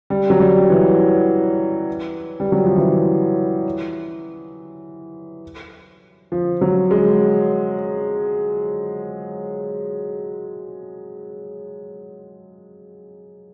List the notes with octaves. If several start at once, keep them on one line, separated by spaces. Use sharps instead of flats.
G3
F#3
G3
E3
G3
F#3
F3
E3
F3
F#3
G#3